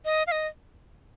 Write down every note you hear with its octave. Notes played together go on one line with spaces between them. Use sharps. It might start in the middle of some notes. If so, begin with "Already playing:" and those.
D#5
F5
D#5